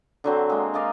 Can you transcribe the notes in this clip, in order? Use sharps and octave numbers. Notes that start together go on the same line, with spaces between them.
D3 F#3 C4
G#3 A#3
A#4 D5 D#5 F5